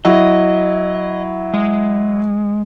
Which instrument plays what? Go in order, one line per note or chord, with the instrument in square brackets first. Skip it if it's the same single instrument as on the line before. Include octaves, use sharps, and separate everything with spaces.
[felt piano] F#3 E4 [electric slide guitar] D#5
[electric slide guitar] G#3